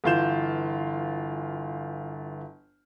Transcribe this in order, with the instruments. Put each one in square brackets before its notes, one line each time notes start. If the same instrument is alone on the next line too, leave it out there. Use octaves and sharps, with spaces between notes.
[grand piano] G1 E3 F4 C6 G6 E7